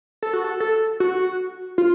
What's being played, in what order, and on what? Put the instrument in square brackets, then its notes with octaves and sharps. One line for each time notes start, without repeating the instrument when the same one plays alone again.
[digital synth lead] A4
F#4
A4
A4
F#4
F4